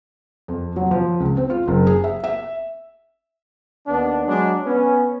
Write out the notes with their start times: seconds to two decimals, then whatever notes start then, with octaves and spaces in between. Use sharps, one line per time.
0.48 F2
0.76 F#3
0.91 F3
1.20 C#2
1.37 C4
1.50 F4
1.68 F#1
1.87 G#4
2.04 E5
2.24 E5
3.87 D#2 B3 D4
4.27 F#3 G#3 D4
4.65 B3 C#4